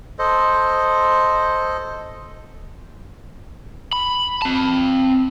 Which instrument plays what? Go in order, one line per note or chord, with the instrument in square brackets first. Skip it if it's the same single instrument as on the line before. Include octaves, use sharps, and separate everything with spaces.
[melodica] A4 C5 D#5
[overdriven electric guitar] B5
C4 A5